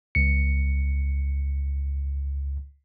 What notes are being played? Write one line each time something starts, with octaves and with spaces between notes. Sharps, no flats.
C#2 C#7